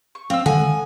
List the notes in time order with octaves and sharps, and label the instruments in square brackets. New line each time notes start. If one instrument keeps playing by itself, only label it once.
[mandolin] C#6
[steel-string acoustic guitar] C4 [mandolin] F5 E6
[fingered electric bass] D3 D#3 G#3 [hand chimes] A4 [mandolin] F#5 [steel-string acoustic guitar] G#5